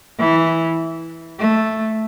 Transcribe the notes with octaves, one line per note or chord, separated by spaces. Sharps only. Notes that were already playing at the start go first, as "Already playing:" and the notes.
E3
A3